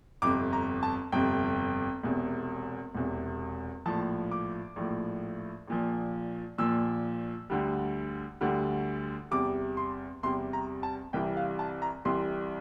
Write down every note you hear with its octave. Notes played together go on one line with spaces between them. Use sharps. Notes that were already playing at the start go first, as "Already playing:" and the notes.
G1 F2 C3 D6
A#5
A5
G1 F2 C3 G5
E1 E2 C3
E1 E2 C3
A#1 A2 F3 A5
D6
A#1 A2 F3
A#1 A#2 F3
A#1 A#2 F3 E6
D2 D3 G3
D2 D3 G3
E2 C3 G3 D6
C6
E2 C3 G3 C6
A#5
A5
C2 C3 E3 G3 G5
F5
A5
A#5
C2 C3 E3 G3 C6